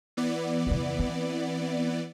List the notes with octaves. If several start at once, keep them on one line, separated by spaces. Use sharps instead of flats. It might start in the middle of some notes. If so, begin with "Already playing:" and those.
E3 B3 D5
F2 C#3
C4